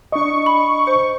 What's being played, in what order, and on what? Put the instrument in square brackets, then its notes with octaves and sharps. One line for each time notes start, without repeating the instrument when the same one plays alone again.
[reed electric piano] D4 D#5 [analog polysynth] C#6
[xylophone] B5
C5